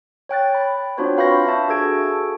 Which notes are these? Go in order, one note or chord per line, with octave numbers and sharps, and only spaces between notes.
C#5 G5 F#6 A6
B5
C4 D4 F4 F#4 C5 C#5
B4 F5 B5 C#6 G6 A#6
D4 E5 A5
F#4 G#4 A4 G#6 D7